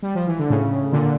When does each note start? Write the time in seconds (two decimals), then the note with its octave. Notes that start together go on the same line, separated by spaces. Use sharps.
0.02 G3
0.15 F3
0.27 E3
0.39 D3
0.50 A2 C#3
0.92 A#2 D3